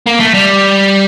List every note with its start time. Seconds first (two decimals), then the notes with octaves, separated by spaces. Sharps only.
0.06 A#3
0.20 A3
0.34 G3